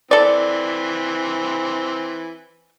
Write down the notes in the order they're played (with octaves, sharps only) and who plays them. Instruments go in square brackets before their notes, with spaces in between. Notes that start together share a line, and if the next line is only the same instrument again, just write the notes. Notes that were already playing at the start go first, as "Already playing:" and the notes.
[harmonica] E3 C4 [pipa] A4 D5